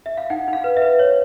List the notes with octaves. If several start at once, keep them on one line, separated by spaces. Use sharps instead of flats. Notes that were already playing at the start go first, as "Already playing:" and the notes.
E5
F5
D#4 F#5
D#4 F5
B4
E5
B4
C#5